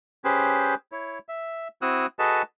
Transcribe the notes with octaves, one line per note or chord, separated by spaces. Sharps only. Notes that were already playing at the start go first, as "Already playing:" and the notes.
C#4 G4 G#4 B4 C5
E4 C#5
E5
C4 E4 F#4 D#6 E6 F#6
F#4 G#4 A4 B4 D#5 A5